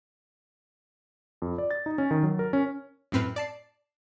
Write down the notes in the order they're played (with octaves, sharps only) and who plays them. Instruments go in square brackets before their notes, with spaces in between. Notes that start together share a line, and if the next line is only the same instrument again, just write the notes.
[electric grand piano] F2
D5
A6
D#4
C#4
D#3
F#3
A#4
C#4
[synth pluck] F#2 A2 C4 B4 F6
D5 A5 C7